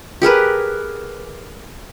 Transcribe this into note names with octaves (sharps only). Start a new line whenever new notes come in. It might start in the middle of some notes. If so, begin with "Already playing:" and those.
G4 G#4 A#4 B4